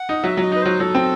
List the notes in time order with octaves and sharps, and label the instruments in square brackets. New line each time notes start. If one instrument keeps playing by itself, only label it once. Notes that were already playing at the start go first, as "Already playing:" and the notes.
Already playing: [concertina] F#5
[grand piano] D#4
[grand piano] F#3 [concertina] E5
[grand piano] F#3 [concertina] D#5
[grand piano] D#4 [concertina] B4
[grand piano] F#3 [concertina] C5
[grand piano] F#3 [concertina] A4
[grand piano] C4